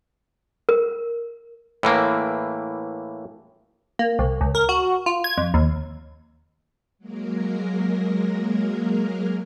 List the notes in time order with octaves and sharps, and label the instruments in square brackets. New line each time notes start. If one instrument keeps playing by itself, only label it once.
[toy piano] A#4
[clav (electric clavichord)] A2 E3 A#3
[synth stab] A#3
C2
C#2
A#4
F#4
F4
G#6
F2
D#2
[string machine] F#3 G#3 A#3 A#4